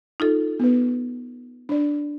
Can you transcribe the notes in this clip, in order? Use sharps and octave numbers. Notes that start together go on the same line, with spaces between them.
D#4 F4 A4
B3 B4
D4 D5